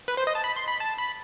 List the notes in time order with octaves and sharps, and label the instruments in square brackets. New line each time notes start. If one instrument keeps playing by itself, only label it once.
[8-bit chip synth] B4
C5
D#5
A5
B5
C6
B5
A5
B5